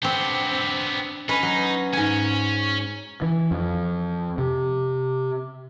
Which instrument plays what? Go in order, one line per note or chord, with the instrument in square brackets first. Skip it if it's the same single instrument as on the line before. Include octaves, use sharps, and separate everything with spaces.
[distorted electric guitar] B3 G4 [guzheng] C4 D4
[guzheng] C#4 B4 [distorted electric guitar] D#4
[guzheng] F#3
[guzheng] G#2 G#5 [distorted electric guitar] C#4
[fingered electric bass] E3
F2
C3